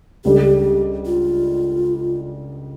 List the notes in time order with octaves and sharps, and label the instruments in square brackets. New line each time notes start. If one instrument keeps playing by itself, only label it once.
[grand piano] C#2 C#3 G3 D4 A4 [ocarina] G4
[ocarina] F4